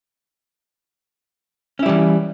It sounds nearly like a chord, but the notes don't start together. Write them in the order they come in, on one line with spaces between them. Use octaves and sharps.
C#4 E4 G3 E3